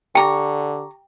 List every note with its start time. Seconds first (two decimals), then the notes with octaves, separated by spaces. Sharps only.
0.15 D3 G4 G5 A#5 C#6 D6